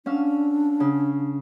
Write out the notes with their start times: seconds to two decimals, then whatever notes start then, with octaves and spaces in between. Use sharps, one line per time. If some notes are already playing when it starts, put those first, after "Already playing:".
0.06 C#4 D4 F5 E6
0.80 C#3